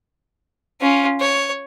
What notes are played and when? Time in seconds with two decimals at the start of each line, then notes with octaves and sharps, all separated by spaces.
0.81 C#4 F4
1.20 C#5